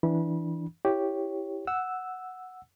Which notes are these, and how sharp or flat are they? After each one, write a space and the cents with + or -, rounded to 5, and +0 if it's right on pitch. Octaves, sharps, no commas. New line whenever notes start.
E3 +0 D4 +0 B5 -30
E4 +0 G4 +0 C#5 +0
F#5 +0 E6 +0